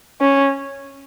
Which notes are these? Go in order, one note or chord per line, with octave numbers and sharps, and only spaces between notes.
C#4